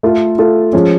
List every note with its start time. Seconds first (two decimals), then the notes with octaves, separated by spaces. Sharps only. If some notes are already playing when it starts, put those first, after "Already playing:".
0.03 A3 F4 A4
0.39 A3 F4 A4
0.73 F3 G#3 C#4